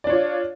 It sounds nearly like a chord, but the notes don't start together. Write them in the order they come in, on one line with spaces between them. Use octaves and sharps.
D5 D4 C#5 F4